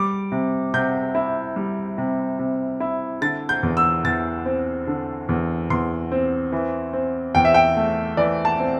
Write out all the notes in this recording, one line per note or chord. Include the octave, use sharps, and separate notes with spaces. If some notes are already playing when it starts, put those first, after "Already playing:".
Already playing: G3 D6
C3
C3 G6
E4
G3
C3
C3
E4
D3 A6
G6
E2
E6
E2 A6
C4
D3
E2
E2 C6
C4
E3
C4
E2 G5
E5
G5
A3
E3 D5
A5
C4